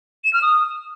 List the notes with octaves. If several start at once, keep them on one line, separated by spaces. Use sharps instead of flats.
E7
F6
D#6